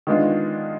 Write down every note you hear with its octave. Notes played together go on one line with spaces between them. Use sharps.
D#3 G#3 B3 D4 F4